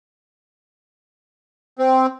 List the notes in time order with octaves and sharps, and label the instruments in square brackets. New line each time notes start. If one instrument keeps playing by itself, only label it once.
[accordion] C4